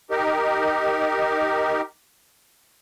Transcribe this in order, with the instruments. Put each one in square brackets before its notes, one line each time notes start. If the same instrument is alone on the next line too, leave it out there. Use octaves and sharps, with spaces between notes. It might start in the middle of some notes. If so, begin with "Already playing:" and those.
[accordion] D#4 G4 A#4